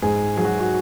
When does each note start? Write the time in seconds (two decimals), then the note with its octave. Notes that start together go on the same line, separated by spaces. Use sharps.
0.02 G#2 G#4
0.37 F#3 G#4
0.45 F#4
0.60 F#4